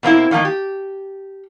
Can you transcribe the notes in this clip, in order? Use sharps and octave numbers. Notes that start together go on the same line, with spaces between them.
B2 A#3 C4 E4
D3 D#3 A3 A#3 D#4
G4